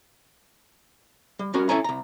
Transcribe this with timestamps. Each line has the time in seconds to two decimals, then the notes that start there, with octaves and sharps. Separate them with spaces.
1.39 G3
1.54 G3 C#4 F#4 A#4
1.69 C#4 E4 A4 C#5 G#5 A#5
1.84 C2 A#5